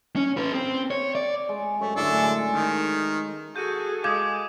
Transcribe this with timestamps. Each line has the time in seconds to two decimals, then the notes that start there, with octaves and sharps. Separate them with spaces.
0.16 C#4
0.37 A4 B4
0.54 C4
0.91 C#5
1.15 D5
1.49 G#3
1.79 F#2 A3 C#5
1.96 F#2 A2 D3 D4 G#4 A4
2.23 G#3
2.52 D#3
3.56 F#4 G#4 A4 G6 D#7
4.04 G#3 F5 D6 D#6 G6 G#6